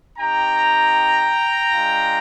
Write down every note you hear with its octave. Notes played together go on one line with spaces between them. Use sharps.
C4 D#4 G4 G5 A#5
G#3 D4 F4